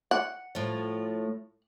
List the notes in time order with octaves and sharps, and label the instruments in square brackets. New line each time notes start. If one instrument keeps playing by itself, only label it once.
[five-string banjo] F#5
[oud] A2 F3